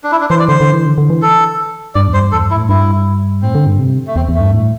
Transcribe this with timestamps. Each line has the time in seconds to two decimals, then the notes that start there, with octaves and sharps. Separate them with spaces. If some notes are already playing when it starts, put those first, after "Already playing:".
0.04 D4
0.12 E4
0.21 D4
0.30 E3 C5
0.40 D5
0.49 D3 C5
0.61 D3
0.73 E3
0.85 D3
0.98 D3
1.10 E3
1.22 A4
1.95 G2 D5
2.08 E2
2.14 G2 C5
2.32 E2 A4
2.44 G2
2.51 E4
2.56 A2
2.69 G2 E4
3.42 A2 C4
3.55 D3
3.67 G2
3.79 C3
4.07 A3
4.16 E2 C4
4.29 E2
4.34 A3
4.41 G2
4.53 A2